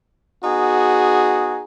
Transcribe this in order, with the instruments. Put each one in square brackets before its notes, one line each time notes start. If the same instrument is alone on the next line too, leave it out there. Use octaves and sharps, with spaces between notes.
[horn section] B3 D#4 F#4 G#4